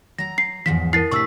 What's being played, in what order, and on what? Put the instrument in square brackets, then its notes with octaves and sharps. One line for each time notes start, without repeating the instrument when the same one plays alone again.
[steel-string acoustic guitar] F#3 A#5 [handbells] A#6
[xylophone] C7
[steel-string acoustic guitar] E2 G#2 F3 [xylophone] B6
[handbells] E4 A#4 [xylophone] A6 C7
[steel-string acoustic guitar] A2 C3 D4 [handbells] C#6 E6 B6